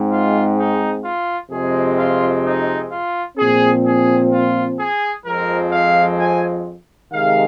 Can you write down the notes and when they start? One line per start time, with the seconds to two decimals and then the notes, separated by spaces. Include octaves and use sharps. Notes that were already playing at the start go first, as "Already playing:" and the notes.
Already playing: G#2 G#3 C4
0.11 F4
0.58 D#4
1.04 F4
1.51 F2 C3 G#3 C4 G#4
1.98 F4
2.45 D#4
2.91 F4
3.38 A#2 F3 C4 G#4
3.85 G#4
4.31 F4
4.79 G#4
5.25 F2 F3 G#3 C4 A#4
5.72 F5
6.19 G#5
7.12 C3 D#3 G#3 F5